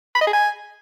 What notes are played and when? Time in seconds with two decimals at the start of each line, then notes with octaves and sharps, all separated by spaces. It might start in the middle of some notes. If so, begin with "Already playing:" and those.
0.15 B5
0.21 D#5
0.27 G#4
0.33 G#5